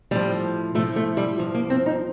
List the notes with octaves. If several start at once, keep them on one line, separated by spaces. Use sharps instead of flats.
A2 F3 G3
A2 F3 A3
A3
G3
G2 F3
A#3
C4
D#4